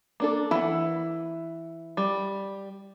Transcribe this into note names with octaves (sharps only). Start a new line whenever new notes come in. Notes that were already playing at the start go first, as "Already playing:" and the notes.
A#3 D4 A4
E3 E4 F#5
G3